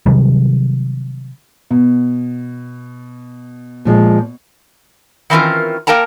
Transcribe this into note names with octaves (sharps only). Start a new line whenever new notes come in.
C3 D#3 F#3 G3
B2
A#2 F3 G#3
D#3 E3 C4 C#4 F4 A#4
A#3 A#4 G5 A5 A#5